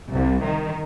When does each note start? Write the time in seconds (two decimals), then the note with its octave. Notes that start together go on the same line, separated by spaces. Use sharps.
0.11 C2
0.44 D#3